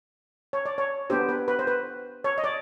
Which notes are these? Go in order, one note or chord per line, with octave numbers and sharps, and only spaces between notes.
C#5
D5
C#5
B3 D4 G4 C5
B4
B4
C5
B4
C#5
D#5
D5